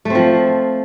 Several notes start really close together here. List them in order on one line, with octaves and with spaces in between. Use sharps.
A3 C4 F3